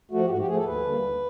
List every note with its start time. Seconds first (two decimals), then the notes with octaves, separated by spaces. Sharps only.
0.11 F3 A3 F#4
0.25 G4
0.30 G#2 F#4
0.39 G4
0.47 F3 A3 G#4
0.57 A4
0.65 D#2 B4
0.83 D3 G3 A#3
1.02 D#2